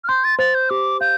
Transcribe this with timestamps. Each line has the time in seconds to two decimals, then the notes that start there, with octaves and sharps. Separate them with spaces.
0.04 F6
0.08 C6 G6
0.24 A6
0.39 C5 A6
0.55 G6
0.70 G4 D6
1.01 F5 G6